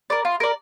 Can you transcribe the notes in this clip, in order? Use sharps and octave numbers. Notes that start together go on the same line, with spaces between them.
A#4 D5
F4
A#4 D5